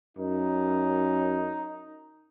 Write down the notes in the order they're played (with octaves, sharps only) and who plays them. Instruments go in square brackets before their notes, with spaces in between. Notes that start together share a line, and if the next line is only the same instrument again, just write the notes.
[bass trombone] F#2 [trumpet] D#4